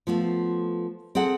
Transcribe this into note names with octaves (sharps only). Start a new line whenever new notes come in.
F3 A3 B3 F4
C4 G#4 A4 F#5